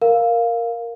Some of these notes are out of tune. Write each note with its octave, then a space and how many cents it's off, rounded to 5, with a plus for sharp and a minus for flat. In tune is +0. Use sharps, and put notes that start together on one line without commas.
A#4 +0 F5 +0